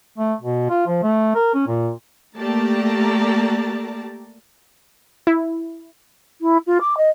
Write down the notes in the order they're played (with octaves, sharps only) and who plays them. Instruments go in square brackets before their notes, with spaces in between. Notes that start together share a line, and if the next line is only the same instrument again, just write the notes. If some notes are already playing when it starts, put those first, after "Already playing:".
[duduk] A3
B2
F4
F3
A3
A#4
C#4
A#2
[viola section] A3 A#3 G4 D5 A5 A#5
[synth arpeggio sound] E4
[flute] E4
F4
D6
D#5